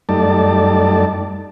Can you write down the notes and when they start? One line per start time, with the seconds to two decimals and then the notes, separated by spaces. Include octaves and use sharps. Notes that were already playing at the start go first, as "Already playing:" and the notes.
0.09 F#2 G3 A3 D#4 D5 A5